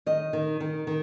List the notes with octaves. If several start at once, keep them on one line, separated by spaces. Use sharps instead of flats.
D#3 D#5
D#3
D#3
D#3